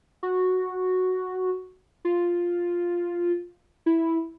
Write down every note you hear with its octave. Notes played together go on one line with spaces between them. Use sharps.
F#4
F4
E4